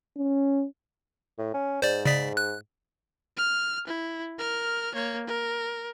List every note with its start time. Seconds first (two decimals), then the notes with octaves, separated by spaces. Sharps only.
0.17 C#4
1.38 A2
1.54 C#4
1.82 G#2 C5 D5
2.06 C#3 D5 B6
2.37 F#6
3.37 F6
3.87 E4
4.38 A#4 F6
4.94 A#3 C#5
5.26 A#4